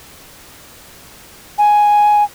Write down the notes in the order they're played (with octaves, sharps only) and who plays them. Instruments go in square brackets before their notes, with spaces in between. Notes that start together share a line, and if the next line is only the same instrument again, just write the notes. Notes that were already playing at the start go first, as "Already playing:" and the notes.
[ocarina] G#5